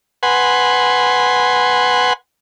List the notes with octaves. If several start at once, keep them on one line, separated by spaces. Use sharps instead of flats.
B4 F#5 G#5 C6